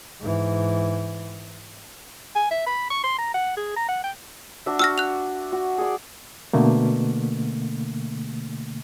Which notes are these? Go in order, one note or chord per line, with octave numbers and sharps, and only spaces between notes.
G#2 E3
G#5
E5
B5
C#6
C6
A#5
F#5
G#4
A#5
F#5
G5
D4 F#4 E5
F#4 E6 F6 A#6
F#6 F7
F#4
G#4 D5
B2 D3 A3 A#3